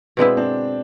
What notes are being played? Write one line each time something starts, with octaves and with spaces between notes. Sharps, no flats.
B2 G#3 B3 C4 D4 E4
C4 D4